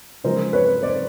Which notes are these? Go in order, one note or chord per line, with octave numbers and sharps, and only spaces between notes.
C#3 F3 G#3 A#4 C5
B4 C#5
C5 D5